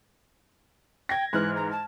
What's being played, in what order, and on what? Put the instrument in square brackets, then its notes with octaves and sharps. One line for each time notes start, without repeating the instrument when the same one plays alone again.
[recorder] G5 [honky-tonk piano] G#6 A#6
[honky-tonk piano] G#2 E3 F6 [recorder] F#6
[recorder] A#5
A5